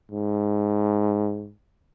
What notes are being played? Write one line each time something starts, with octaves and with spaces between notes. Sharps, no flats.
G#2